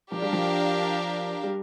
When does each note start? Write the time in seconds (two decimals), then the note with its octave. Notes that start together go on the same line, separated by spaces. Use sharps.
0.12 F3 D4 G4 A#4 F5
0.22 G3
0.33 F3
1.44 G3